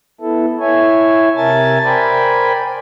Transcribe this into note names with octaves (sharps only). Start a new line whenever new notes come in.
B3 E4 A4
E4 C#5 E5 G#5
C3 A#4 E5 G#5 A5 A6
A#4 C5 D5 G5 G#5 B5